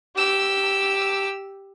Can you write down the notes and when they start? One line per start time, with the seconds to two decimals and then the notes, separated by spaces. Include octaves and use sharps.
0.16 G4 E6